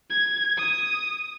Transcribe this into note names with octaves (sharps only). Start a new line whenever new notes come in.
G#6
D#6